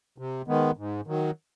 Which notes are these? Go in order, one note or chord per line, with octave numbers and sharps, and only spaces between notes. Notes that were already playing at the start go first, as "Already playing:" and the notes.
C3
D#3 G#3 B3
G#2
D#3 F#3